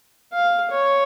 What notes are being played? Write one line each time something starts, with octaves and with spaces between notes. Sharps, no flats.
F5
C#5